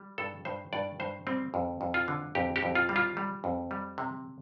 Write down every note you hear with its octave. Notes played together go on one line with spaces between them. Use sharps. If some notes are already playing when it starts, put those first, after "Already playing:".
Already playing: G3
G2 A4
G2 C5
G2 D5
G2 C5
G3 C4
F2
F2
F4
D3
F2 G4
G4
F2
F4
G3
F4
G3
F2
G3
C3